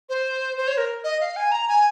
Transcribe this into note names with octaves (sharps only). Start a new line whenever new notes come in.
C5
C5
C#5
A#4
D#5
F5
G#5
A#5
G#5